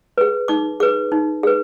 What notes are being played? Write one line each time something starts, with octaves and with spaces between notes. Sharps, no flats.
G#4 B4
D#4 D6
G#4 B4 D6
D#4
G#4 B4